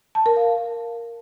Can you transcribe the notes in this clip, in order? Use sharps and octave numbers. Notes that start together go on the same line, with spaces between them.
A5
A#4
F5